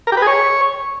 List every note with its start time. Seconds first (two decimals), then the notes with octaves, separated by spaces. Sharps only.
0.07 A#4
0.12 G4
0.17 B4
0.22 G#4
0.27 C#5